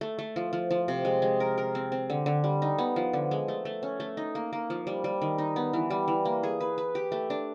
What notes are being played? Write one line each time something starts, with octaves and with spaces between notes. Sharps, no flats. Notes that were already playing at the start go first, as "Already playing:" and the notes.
A3
A3
F3
F3
F3
C3
G#3
G#3
A#4
A#4
C4
C4
D3
D3
G3
D#4
B3
F3
D3
G#3
A3
A3
C#4
A3
D#4
A#3
A#3
F3
G3
G3
D#3
D#4
B3
E3
G3
E3
A#3
G#4
B4
B4
G4
A3
D4